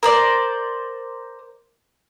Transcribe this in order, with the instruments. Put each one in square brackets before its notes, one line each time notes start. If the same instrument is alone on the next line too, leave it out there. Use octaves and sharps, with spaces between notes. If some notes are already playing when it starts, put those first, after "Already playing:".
[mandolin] A#4 C5 D5